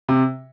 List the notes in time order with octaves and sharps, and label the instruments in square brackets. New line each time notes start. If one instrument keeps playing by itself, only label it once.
[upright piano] C3